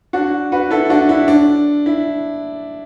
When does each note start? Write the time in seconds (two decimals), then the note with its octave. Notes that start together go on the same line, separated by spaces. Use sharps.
0.13 D4 F#4
0.52 F#4 B4
0.71 E4 A4
0.90 D4 F#4
1.09 E4
1.28 D4
1.86 E4